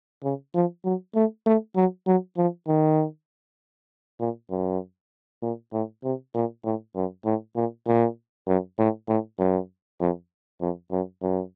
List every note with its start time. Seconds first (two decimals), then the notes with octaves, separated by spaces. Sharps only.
0.23 C#3
0.55 F3
0.84 F#3
1.15 A3
1.46 A3
1.76 F#3
2.07 F#3
2.37 F3
2.67 D#3
4.20 A#2
4.50 F#2
5.42 A#2
5.73 A2
6.04 C3
6.35 A#2
6.65 A2
6.95 F#2
7.25 A2
7.56 A#2
7.87 A#2
8.47 F#2
8.79 A2
9.08 A2
9.39 F#2
10.00 F2
10.61 F2
10.91 F#2
11.22 F#2